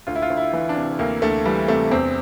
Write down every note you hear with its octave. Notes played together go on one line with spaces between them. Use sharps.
D2 F4
E4
F4
D2
E4
E3
D4
C3
D2 A#3
D2 A3
E3 G3
C3 A3
E2 C4